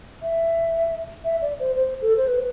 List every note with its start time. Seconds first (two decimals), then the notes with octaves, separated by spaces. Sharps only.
0.22 E5
1.24 E5
1.42 D5
1.60 C5
1.76 C5
2.01 A4
2.17 C5
2.28 B4